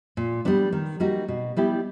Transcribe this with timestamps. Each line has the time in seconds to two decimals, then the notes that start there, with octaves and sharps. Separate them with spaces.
0.17 A#2
0.45 G3 B3 D4
0.73 D#3
1.00 G3 A#3 D#4 F#4
1.28 B2
1.57 G3 B3 E4 G4